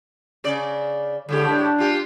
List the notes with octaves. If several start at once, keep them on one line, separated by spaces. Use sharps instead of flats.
C#3 D5
A2 D3 G#3 G4
D4
F4 G4